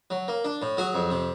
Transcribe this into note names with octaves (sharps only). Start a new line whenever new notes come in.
F#3
A#3
D4
A2
F#3 F#4 G#4
F2
C3